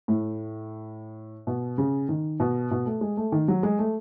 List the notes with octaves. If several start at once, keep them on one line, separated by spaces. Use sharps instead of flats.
A2
B2
C#3
D#3
B2
B2
A3
G#3
A3
D#3
F#3
G#3
A3